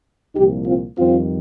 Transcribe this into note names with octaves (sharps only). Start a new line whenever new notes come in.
C2 A#2 F3 D#4 G4
C4 F4
F2 D#3 G3 C4 F4